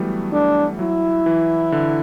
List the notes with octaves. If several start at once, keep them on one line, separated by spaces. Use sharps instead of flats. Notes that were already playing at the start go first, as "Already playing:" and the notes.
Already playing: E3 F#3 G3 A3 B3
A3 D4
F#3 E4
E3
D3